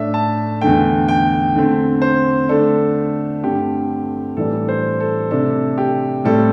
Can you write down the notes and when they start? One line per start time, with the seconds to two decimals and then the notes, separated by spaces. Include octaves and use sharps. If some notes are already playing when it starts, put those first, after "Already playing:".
Already playing: A2 A3 D4 E5
0.14 A5
0.61 E2 D3 A3 G5
1.08 G5
1.56 D3 A3 C4
2.02 C5
2.49 D3 A3 D4 A4
3.43 G2 D3 A3 C4 G4
4.36 A2 E3 G3 D4 A4
4.69 C5
5.00 A4
5.31 C3 A3 D4 A4
5.78 G4
6.25 A2 G3 C4 A4